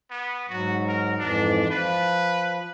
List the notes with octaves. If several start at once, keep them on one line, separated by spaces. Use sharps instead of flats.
B3
G#2 F#3 F#4
A#4
F2 G#2 E3 D4
F3 B4